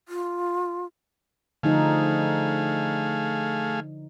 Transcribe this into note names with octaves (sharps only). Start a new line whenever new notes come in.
F4
D3 F3 A3 D#4 G#4 F5